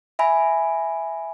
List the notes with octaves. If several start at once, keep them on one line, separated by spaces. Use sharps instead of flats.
E5 G#5 B5